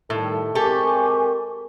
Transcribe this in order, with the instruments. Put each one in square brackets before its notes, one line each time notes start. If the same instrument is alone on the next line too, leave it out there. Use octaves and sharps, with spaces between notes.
[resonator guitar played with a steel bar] A2 [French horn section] D#3 G3 A4
[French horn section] G#3 C4 A#4 [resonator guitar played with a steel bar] G4 A4 [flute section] G#5 C#6 D6